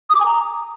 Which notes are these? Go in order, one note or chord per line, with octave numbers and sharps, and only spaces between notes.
D#6
D6
G#5
A#5